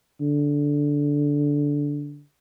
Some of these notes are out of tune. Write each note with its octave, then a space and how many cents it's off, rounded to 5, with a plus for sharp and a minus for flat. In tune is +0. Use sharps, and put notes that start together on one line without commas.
D3 -10